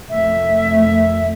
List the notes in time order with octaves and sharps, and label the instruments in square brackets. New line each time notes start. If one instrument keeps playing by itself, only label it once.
[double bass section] F1 D#3 A3 [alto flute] E5